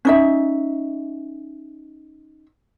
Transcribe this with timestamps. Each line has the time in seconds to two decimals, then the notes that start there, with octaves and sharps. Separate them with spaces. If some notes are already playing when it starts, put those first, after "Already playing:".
0.05 C#4 D#4 E5